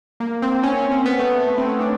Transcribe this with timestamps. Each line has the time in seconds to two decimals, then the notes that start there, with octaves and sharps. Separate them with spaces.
0.20 A#3
0.42 C4
0.63 C#4
0.77 C#4
0.92 C4
1.05 B3
1.19 A3
1.34 A3
1.47 A3
1.58 C4
1.68 C#4
1.80 D4